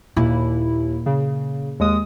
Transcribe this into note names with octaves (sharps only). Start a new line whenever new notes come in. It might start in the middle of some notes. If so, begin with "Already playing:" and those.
D#2 A#2 E4
C#3
D#2 G#3 D#6